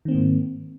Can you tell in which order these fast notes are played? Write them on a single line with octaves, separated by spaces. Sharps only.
D#3 C4 A#3 G#2